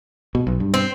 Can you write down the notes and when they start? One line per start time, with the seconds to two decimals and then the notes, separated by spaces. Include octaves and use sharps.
0.35 B2
0.47 B1
0.60 G2
0.74 C4